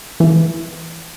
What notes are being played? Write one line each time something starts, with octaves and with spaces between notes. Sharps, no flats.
E3